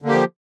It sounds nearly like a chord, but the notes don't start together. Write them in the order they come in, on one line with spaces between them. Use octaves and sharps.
D3 A#3 G4 F3